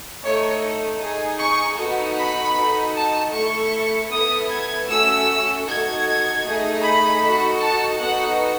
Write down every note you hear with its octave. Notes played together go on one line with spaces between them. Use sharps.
A3 D#4 A4 C#5
D#4 G#4
C#6
B3 D#4 F#4 A4
B5
D#4 F#4 A4
A5
A3 E4 A4 C#6
B3 E4 A4 D#6
G#6
A3 C#4 F#4 A4 E6
D#4 F#4 A4 G#6
A3 D#4 G#4
B5
D#4 F#4 A4
A5
B3 D#4 F#4 A4 F#5